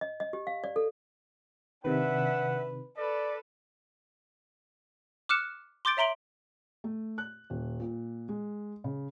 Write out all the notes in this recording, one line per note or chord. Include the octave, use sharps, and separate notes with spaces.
D#5
D#5
G4
F5
D5
A4
C3 D#3 D4 B4 E5 F#5
A4 B4 D5
D6 F6 F#6 C#7 E7
C6 D6 G6 A6 D7
C#5 E5 A#5 C6 D7 F#7
A3
F#6
D#1
A#2
G#3
C#3